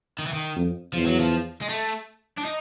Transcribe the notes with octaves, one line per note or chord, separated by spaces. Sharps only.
D#3
E3
D#3
F2
E2 F3
F#3
F3
G#3
A3
D4
D#4